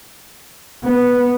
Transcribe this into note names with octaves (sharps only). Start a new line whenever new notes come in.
B3